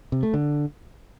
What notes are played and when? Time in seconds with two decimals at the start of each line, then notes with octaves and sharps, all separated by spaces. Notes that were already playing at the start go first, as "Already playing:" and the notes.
0.12 C3
0.23 A3
0.34 D3